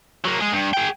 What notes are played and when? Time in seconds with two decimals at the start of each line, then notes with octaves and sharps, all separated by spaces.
0.25 F#3 A#3
0.41 G#3 G#4
0.52 G2
0.73 G#4 G5